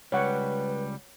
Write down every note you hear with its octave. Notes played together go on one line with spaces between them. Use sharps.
C#2 G3 B4 C#5 F#5